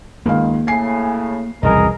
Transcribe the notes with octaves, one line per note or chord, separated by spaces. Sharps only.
C#2 D#3 A#3 F5
A2 C#3 G#5 C7
E1 C2 F2 E3 G#4 A#4 D#5